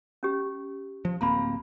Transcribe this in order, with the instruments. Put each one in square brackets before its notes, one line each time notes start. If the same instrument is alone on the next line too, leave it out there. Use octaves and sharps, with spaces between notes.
[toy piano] C#4 G4
[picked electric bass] F3
[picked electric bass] D1 A#3 C4 [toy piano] A#5 B5